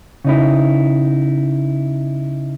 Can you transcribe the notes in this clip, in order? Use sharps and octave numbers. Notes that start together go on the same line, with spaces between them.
C#3 D#4 E4